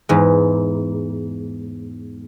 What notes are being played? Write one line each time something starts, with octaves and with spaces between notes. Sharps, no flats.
E2 G#2